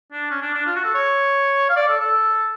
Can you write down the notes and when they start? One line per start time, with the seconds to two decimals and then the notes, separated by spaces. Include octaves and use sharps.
0.13 D4
0.31 C#4
0.42 D4
0.55 D4
0.66 F4
0.76 F#4
0.84 A4
0.94 C#5
1.69 F5
1.76 D5
1.88 A4
2.00 A4